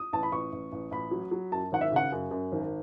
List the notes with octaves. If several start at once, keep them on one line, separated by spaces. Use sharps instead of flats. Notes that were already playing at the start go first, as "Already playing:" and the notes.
Already playing: D#6
A1 A5
B5
A1 C#6
A1
A1
A1 B5
F#3
F#3
F#2 A5
G#1 F#5
E5
C#3 F#5
F#2
F#2
G#1